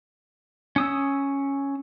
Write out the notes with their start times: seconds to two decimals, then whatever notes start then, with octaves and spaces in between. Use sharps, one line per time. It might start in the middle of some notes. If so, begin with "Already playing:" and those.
0.76 C#4 D#6 E6